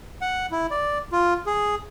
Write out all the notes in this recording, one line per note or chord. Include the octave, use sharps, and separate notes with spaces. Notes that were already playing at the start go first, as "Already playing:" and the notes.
F#5
E4
D5
F4
G#4